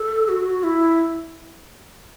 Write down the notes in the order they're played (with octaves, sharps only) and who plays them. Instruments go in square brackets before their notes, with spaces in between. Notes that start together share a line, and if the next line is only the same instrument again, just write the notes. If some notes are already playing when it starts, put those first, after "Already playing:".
Already playing: [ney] A4
F#4
E4